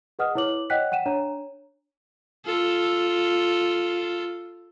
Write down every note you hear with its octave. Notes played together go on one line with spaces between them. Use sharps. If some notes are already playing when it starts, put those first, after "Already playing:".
G#4 B4 D#5 F#5 D#6 F6
E4 B4 C#5 D6 F#7
C#5 D#5 F#5 G5 F#6 B6
F#5 G5 D#7 E7
D4 C#5 A#5
F4 A4